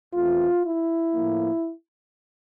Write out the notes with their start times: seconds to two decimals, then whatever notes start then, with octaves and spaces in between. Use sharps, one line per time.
0.13 E2 E3 A3 C4 F4
0.64 E4
1.14 A2 F3 A#3